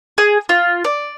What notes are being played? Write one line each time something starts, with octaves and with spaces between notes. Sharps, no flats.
G#4
F4
D5